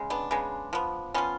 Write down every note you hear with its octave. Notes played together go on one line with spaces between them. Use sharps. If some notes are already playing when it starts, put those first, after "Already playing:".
Already playing: C#3 G#3
B3 D4
C#3 G#3 B3
F3 B3
F3 B3 C#4 F4